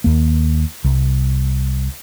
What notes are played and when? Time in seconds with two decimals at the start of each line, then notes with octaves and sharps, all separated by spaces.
0.04 D#2 A#3
0.84 C2